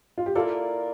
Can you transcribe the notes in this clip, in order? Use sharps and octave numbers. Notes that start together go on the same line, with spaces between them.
F4
G4
A#3 E4 F4 A4 A#4 D5